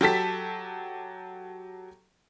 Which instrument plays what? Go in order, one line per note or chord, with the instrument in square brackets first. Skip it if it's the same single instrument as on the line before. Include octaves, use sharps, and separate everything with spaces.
[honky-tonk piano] F#3 G4 A4 B6